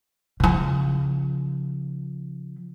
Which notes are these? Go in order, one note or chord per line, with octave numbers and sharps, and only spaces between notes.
C#3 F3